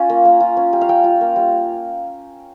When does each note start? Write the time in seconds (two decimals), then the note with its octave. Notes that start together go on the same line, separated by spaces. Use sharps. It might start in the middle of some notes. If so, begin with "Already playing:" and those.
Already playing: C#4 F4 G#5
0.10 A#3
0.25 A#3
0.40 F4
0.57 C#4
0.73 G3 G5
0.81 F5
0.88 G3 G5
1.04 F4
1.21 A#3
1.36 G3